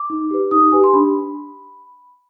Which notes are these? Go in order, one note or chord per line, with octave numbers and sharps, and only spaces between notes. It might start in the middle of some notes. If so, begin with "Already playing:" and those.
Already playing: D6
D#4
G4 B4
D#4 D#6
G4 B4 G#5
C6
D4 B5